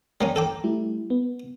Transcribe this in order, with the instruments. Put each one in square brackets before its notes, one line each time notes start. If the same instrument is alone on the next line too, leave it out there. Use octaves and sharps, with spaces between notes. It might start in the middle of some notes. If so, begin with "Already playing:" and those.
[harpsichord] G3 A#3 C#4 [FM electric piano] A#5
[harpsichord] A4 G5 D6
[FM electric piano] G3 A3 E4
B3